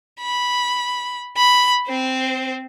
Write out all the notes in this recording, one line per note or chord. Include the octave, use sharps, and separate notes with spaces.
B5
B5
C4 C5